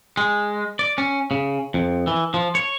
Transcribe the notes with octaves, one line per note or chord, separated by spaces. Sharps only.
G#3
D5
C#4
C#3
F2
E3
F3
C#5